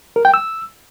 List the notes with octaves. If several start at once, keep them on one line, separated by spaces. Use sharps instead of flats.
A#4
G5
E6